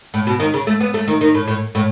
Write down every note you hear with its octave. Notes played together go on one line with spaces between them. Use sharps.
A2
B2
D#3
C#3
A3
B3
A3
D#3
D#3
A2
A2
A2